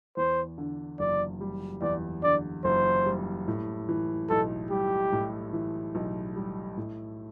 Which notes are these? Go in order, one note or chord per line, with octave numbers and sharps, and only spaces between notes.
E2 C5
D3
F#1 D5
G3
E2 D5
D3 D5
F#1 C5
G3
A2
E3
B1 A4
G3 G4
A2
E3
B1
G3
A2